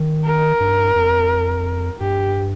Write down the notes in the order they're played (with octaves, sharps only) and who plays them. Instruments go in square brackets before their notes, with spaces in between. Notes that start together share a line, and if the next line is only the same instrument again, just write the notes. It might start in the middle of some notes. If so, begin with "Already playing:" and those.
Already playing: [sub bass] D#3
[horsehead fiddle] A#4
[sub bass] G2
F2
[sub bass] G2 [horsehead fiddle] G4